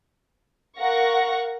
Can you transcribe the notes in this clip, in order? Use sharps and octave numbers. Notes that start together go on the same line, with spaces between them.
A#4 F5 F#5 C#6 A#6